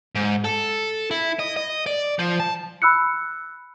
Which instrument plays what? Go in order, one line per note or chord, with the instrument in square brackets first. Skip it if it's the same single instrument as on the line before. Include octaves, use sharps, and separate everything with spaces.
[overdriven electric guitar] G#2
A4
E4
D#5
D#5
D5
F3
A5
[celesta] B5 E6 F#6 C#7